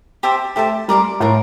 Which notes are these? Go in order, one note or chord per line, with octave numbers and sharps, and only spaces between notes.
G4 C5 E5 A5
A3 G4 C5 E5 A5
G3 A#4 D5 A5 C6
A2 A#4 D5 A5 C6